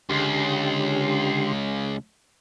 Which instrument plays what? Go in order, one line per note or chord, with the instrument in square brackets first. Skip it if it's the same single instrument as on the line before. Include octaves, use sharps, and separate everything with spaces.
[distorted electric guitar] C#2 [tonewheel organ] D3 G4 C6